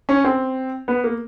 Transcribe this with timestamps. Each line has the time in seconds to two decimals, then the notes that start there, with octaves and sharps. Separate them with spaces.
0.09 C#4
0.24 C4
0.88 B3
1.04 A#3